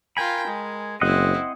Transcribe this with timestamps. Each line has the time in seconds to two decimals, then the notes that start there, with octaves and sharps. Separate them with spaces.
0.17 F4 A#4 G5 G#5 B5
0.47 G#3
1.01 F#1 C4 E4 C5 D#5 F#5